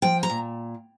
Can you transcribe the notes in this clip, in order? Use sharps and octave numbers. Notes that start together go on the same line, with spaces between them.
F3 G5
A#5
A#2